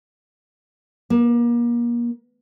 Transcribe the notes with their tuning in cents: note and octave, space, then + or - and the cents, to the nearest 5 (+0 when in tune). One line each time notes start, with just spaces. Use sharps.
A#3 +30